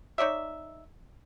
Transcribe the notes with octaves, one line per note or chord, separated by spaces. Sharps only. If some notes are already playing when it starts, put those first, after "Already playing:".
D#4 C#5 D5 E5